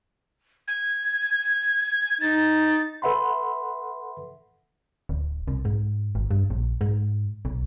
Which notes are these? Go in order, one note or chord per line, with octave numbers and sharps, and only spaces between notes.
G#6
D#4 A6
A4 B4 E5 F#5 B5 C6
D1
C2
G#2
G#1
G2
A#1
G#2
B1